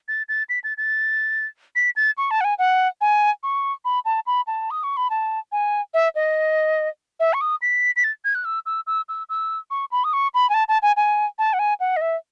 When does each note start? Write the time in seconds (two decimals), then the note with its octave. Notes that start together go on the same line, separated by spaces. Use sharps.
0.08 A6
0.29 A6
0.49 B6
0.64 A6
0.78 A6
1.75 B6
1.96 A6
2.18 C#6
2.31 A5
2.41 F#5
2.44 G#5
2.59 F#5
3.01 G#5
3.43 C#6
3.85 B5
4.05 A5
4.26 B5
4.47 A5
4.71 D#6
4.83 C#6
4.97 B5
5.10 A5
5.52 G#5
5.94 E5
6.15 D#5
7.20 E5
7.33 C#6
7.41 D#6
7.62 B6
7.96 B6
8.04 A6
8.25 G#6
8.35 F#6
8.45 E6
8.66 E6
8.87 E6
9.09 E6
9.29 E6
9.70 C#6
9.91 B5
10.04 D#6
10.13 C#6
10.34 B5
10.49 G#5
10.54 A5
10.68 A5
10.82 G#5
10.97 G#5
11.39 A5
11.53 F#5
11.59 G#5
11.80 F#5
11.96 D#5
12.01 E5